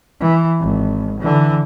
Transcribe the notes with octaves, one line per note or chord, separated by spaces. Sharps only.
E3
G#1
D3 E3